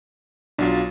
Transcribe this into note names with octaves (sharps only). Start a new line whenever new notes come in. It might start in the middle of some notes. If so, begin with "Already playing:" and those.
B1 F#3 D4 F4 F#4